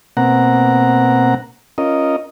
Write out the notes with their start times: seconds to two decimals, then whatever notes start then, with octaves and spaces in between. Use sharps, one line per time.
0.17 B2 A#3 C4 F#5 A#5
1.78 C#4 F4 A#4 D#5